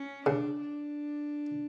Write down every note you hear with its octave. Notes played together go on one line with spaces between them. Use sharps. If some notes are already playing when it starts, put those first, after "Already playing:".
Already playing: C#4
C#3 D4
D4